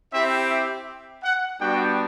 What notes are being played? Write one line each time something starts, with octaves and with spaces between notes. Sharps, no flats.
C4 E4 G4 E5
E5
F#5
G3 B3 D4 F#4 G5